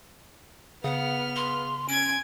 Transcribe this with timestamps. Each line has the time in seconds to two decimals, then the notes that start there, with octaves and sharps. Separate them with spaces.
0.84 C#3 B3 F#5 F6
1.36 C6
1.89 C#4 G#5 G#6 D7